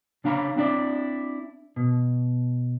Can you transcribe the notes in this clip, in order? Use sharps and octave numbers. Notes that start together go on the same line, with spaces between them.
C#3 D4 F5 A#5 B5
C4 D4 E4 D5
B2